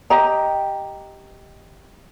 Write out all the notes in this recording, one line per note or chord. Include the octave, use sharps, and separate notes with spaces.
G4 D#5 G5 A#5